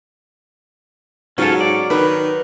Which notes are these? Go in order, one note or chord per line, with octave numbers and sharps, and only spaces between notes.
G#2 F#3 C#4 F4 A4
D5
D#3 B4